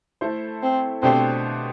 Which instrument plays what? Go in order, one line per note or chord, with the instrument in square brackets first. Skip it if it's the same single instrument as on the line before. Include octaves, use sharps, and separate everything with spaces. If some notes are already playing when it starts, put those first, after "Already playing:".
[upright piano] A3 E4 A4 C5
[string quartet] C4
[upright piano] B2 A3 D4 G4 C5 [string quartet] C4